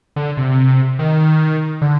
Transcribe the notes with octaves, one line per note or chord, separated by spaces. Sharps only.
D3
C3
D#3
D3